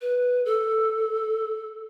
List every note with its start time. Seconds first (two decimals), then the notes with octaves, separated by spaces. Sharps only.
0.01 B4
0.45 A4